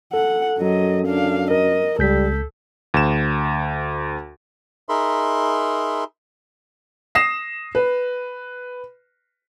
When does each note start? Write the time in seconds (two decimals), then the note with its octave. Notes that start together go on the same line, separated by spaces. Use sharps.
0.14 A4 F#5
0.58 F#2 F#3 D#5
1.07 D4 F5
1.51 A#4 D#5
1.99 C#2 G3 A4 G6 B6
2.94 D2 E7
4.89 D#4 G#4 A#4 E5 B5 C6
7.15 D#6 A#6 C7 E7
7.75 B4